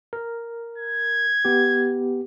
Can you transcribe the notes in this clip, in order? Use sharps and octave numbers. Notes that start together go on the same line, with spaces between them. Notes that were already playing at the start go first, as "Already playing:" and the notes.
A#4
G#6
B3 G4